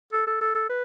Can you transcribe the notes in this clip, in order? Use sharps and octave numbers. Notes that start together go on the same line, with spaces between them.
A4
A4
A4
A4
B4